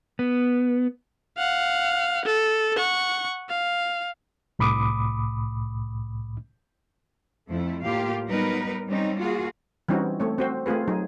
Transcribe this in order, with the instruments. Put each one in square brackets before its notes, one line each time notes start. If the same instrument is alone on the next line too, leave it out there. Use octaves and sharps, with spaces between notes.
[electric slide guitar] B3
[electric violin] F5 F#5
A4
F#5 C#6
F5
[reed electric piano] C2 A2 B5 D6 D#6
[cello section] F2 A3 E4
A2 A#3 F4 G4 F5
F#3 G3 B3 D#4 A#4 B4
G3 C4 C#4 D#4
A#3 F4 F#4 G#4
[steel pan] E3 G3 C4 C#4 D#4 F#4
A3 C4 C#5
C4 F#4 C5
A3 C4 F4 G#4 B4
F#3 D#4 G#4